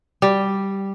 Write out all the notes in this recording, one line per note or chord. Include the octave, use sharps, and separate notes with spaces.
G3